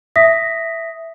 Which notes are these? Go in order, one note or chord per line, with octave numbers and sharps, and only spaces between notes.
E5 D#6 A#6 B6